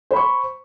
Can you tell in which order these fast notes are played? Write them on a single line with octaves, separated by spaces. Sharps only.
C5 B5 C#6